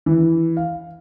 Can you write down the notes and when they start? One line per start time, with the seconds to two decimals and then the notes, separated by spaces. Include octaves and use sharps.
0.06 E3
0.57 F5